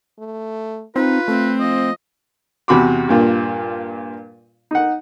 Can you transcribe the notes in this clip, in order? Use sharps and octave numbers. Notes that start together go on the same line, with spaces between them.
A3
C4 D#4 F4 B4
A3 C4
F3 D#5
E2 C3 F#4 B5 C6 D6
G2 A#2 F4
D#4 F#5